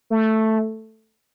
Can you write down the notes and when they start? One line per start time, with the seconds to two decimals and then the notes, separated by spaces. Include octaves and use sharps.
0.10 A3